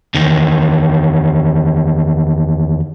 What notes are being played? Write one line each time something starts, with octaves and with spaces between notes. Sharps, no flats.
E2 D#3